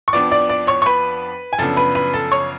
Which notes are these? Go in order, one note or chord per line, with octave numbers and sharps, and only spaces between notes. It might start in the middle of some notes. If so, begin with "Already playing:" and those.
C#6
F2 F3 B3 D4 D5 D6
D5 D6
D5 D6
C#5 C#6
C#6
B4 B5
G#5
F#2 C#3 F3 B3 D4 A4 A5
B4 B5
B4 B5
A4 A5
C#5 C#6